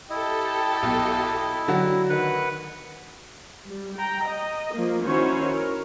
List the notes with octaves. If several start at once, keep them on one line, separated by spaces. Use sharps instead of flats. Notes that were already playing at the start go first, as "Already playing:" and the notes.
E4 G4 A4 D#5
B1
D3 F#3 F#4
D#3 B4 F#5
G3
G5 A#5
D#5
F3 A#3
D#3 C#4 E4 F#4 C5 C#5
A#4